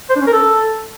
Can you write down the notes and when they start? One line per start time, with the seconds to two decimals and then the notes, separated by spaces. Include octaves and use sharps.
0.10 C5
0.16 D4
0.21 C#4
0.27 A#4
0.33 A4